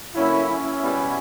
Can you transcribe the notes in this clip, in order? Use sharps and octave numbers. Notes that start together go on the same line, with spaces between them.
D3 F#3 A#3 C#4 E4
C#4 E4
B2 G3 B3